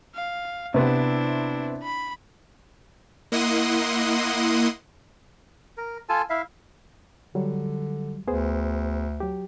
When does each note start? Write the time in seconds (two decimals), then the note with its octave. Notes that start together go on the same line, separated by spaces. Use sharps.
0.15 F5
0.74 C3 B3 D4 E4
1.83 B5
3.32 A#3 E4 D#5 F#5 C6 D#6
5.77 A#4
6.09 F4 A4 G#5 A5
6.30 E4 E5 F5
7.35 D3 F#3 G3
8.27 D2 B3 G#4 C5
9.20 F#3 G4